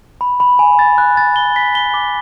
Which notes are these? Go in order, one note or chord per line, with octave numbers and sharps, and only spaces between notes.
B5
B5
G#5
A6
F#6
A6
G7
B6
G7
D6